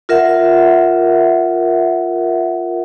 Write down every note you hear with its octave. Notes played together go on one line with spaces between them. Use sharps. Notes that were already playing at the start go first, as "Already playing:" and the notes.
F4 A#4 E5 F#5